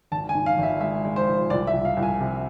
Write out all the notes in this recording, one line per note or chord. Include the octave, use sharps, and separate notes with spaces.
G#1 A5
G#5
G#2
F5
G#1 E5
G#3 E5
G#3
C5
F3
C2 D5
E5
C2
F5
C2
G#5
C3